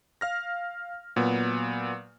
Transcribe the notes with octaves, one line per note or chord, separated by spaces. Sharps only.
F5 F6 A#6
A#2 F#3 B3